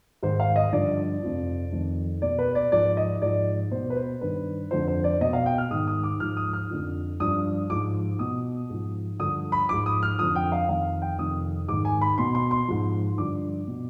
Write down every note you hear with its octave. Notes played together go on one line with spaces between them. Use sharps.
G#2 D#3 C5
F5
D#5
G2 D3 F3 D5
F2 C3 F3
F2 D#3
B2 D5
B4
D5
G#2 F3 D5
D#5
G#2 F3 D5
B2 C5
B4
C5
G2 D#3 B4
F2 D3 F3 C5
C5
D5
B2 D#5
F5
G5
F6
G#2 D#3 D#6
D#6
D6
G#2 F3 F6
D#6
F6
F2 D3 F3
G2 F3 D#6
G#2 F3 D6
B2 D#6
G#2 F3
G2 D3 F3 D#6
B5
G#2 F3 D6
D#6
F6
F2 D3 F3 D#6
G5
F5
F2 D#3 F5
G5
F2 C3 D#3 D#6
G#2 D#3 D6
G#5
B5
B2 C6
C6
C6
G#2 F3
G2 D3 F3 D6
B2